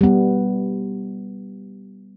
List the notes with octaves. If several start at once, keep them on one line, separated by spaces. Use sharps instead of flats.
G3 B3